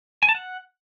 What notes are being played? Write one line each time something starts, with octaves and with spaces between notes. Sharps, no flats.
G#5
A5
F#5